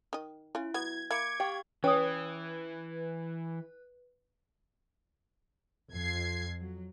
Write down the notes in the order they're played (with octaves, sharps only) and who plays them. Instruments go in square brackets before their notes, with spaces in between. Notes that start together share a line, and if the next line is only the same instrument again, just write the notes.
[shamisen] D#3 D#5
[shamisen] C#4 F4 [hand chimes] E4
[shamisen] F#3 B3 [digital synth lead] G#6
[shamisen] A#3 E4 [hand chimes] D6 C#7 D7 [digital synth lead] G#6
[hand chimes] G4 F5 C#6 [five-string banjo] G5
[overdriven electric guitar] E3 [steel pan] C#4 [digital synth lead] B4 [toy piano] G5 D#6
[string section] F2 G#6 C7
F#3